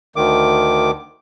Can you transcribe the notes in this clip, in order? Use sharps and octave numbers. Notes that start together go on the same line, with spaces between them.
D2 D#3 D6